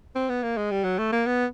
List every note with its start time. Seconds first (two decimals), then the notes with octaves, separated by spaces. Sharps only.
0.15 C4
0.29 B3
0.43 A#3
0.57 G#3
0.71 G3
0.84 F#3
0.99 A3
1.12 A#3
1.26 B3